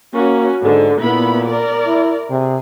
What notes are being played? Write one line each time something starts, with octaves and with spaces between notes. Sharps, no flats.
A#3 C#4 F#4
G#2 D3
A#2 B3 E4 B5
A#4 D5
E4
C3 G#4